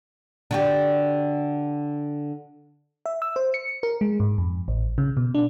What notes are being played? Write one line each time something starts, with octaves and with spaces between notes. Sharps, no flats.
D3 F#4 G4
E5
E6
C5
C#7
A#4
G#3
G#2
F2
A1
C#3
B2
D4